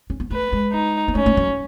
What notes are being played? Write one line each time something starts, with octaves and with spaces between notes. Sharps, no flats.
C#4
B3
A3 B4
G#3
D#4
B3
A3 C#4
A3
F#3